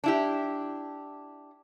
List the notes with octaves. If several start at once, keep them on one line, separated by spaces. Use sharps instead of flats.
D4 E4 G4